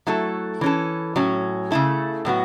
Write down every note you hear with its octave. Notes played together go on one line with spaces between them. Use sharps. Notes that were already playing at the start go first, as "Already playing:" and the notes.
F#3 A3 E4 A4
E3 C#4 A4
A2 F#3 C#4
C#3 A3 E4 A4
A2 F#3 B3 F#4